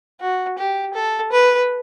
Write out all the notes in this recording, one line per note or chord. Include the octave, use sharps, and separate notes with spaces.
F#4
G4
A4
B4